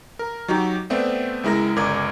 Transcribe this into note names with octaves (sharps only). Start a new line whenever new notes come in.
A#4
F#3 D#4 F#4 G4
A3 B3 C4 D5 E5
C#2 G#3 E4 A#4 A#6
G1 C#2 A#4 D5 D6 G#6